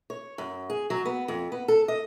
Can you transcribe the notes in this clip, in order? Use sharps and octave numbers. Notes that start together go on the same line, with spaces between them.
C#5
F#2
G#4
F#3
B3
F2
B3
A4
D#5